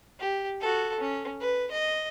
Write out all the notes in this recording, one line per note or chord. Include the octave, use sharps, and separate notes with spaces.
G4
F#4 A4
C#4
B4
D#5